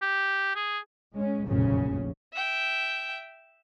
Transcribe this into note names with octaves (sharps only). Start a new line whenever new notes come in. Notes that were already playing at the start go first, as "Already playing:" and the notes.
G4
G#4
G#3 C#4
F1 A#1 F#2 A#2 C#3 C#4
E5 G5